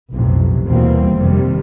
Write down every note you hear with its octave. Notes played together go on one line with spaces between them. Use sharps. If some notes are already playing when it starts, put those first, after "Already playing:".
B1 F2 A2 C3
D#2 B2 E3 G3 A#3 C4
G1 F2 C3 D#3 G3